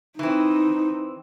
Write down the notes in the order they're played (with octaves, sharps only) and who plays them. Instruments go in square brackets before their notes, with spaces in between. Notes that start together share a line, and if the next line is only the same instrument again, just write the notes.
[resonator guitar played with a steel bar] E3 C4 [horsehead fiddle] D#4